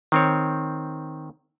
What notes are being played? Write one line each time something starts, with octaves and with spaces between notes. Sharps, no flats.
D#3 C4 C#5